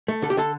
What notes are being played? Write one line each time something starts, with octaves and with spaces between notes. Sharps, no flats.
A3
D3 A4
G4
D3 A4